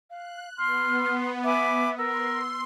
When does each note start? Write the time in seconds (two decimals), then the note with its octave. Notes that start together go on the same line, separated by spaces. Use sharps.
0.10 F5 F#6
0.57 B3 C6 F6
1.44 E5 G#5 B5 D6
1.98 A#4 C6 E6